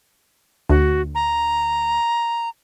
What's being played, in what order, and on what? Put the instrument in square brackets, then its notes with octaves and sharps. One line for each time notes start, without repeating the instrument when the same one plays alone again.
[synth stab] D2 [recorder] F#4
[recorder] A#5